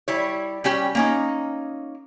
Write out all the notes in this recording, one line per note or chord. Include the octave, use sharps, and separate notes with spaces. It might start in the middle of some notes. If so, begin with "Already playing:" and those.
G3 E4 C#5
G3 C#4 G4
A#3 C#4 D#4